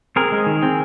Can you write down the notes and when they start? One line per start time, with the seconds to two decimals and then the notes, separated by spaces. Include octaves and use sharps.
0.16 C4 G#4 A#4
0.32 G#3
0.47 D#3
0.62 C4